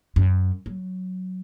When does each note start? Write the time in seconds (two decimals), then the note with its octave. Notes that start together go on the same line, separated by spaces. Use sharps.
0.16 F#2
0.66 F#3